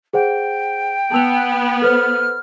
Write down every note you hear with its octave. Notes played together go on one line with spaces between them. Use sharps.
G#4 C5 F#5 G5
B3 A5 E6 F7
A4 B4 C5 F6